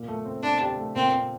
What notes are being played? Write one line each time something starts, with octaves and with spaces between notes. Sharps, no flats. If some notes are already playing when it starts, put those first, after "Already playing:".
Already playing: A#2
A3
C4
C4 D4
G4
A3
A#2 C4
C4